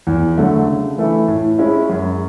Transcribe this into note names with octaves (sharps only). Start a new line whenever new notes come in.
E2
D3 F#3 A3
C#3
E3 A3 E4
A2
G#3 C#4 E4
F#2